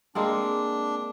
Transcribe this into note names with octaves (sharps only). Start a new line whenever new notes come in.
G#3 A#3 C4 D4